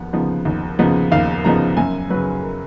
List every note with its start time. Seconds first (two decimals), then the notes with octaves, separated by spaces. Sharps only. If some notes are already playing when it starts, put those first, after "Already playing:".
Already playing: D#2 F3 B3 F#5
0.13 C#3 F3 B3 D#4
0.45 D#2
0.79 C#3 F3 B3 D#4
1.12 D#2 F5
1.44 C#3 F3 B3 D#4 A#5
1.77 F#2 G#5
2.10 C#3 F#3 B4
2.43 A#4